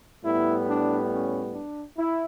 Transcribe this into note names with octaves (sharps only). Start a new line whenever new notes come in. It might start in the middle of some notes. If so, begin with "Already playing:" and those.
A2 G3 B3 E4
D4
C#4
D4
E4